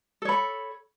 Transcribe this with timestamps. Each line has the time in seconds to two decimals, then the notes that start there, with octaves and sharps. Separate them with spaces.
0.22 A4
0.25 C#5
0.29 B5